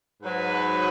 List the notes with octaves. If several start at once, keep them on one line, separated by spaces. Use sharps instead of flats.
G#2 F#3 B4